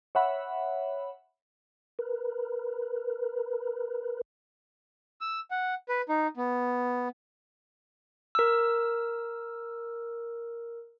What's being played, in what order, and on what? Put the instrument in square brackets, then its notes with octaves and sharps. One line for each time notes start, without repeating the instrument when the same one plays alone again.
[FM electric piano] C#5 E5 F#5 B5
[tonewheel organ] A#4 B4
[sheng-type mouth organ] E6
F#5
B4
D#4
B3
[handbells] A#4 E6